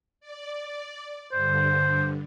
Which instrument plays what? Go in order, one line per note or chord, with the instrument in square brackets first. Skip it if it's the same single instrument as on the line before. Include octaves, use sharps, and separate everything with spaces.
[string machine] D5
[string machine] G2 D3 [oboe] C5